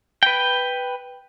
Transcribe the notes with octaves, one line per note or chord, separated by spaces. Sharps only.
B4 G5